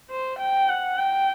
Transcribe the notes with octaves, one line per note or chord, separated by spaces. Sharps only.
C5
G5
F#5
G5